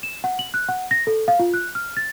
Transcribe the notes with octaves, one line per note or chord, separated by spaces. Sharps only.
E7
F#5
F#7
F#6
F#5
A#6
A4
F5
F4
F#6
F6
A6